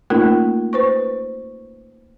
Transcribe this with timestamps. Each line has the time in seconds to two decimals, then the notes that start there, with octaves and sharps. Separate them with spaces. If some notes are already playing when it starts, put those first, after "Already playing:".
0.10 A3 A#3 C#4 D#4 F4 A#4
0.73 B4 C5 C#6